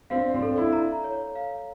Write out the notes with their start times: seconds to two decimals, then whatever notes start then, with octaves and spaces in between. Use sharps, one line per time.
0.10 C4 D4 F5
0.34 C4 D4
0.42 A4
0.58 D4 E4
0.73 A#5
1.04 C#5
1.35 F5